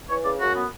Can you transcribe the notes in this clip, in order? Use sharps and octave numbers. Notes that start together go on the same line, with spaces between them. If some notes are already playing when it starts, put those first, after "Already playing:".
E3 C#5
C#3 D5
F#2 F#4
B3